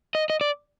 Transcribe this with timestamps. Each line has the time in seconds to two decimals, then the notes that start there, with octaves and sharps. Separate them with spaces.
0.15 D#5
0.30 D#5
0.41 D5